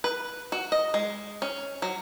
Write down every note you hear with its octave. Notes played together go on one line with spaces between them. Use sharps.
B4
F#4
D#5
G#3
C#4
F#3